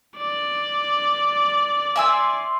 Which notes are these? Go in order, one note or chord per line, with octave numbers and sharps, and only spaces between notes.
D5
E5 G#5 C6 E6